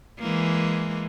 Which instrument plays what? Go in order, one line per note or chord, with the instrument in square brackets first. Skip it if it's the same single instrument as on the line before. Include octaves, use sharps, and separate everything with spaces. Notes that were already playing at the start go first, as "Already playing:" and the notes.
[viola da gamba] E3 G#3 A#3